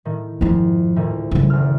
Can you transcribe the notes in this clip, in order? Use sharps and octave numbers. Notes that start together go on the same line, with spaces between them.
A2 D#3
F2 G#2 F3 E4
D2 A2 D#3
C#3 G3
E1 F#2 F6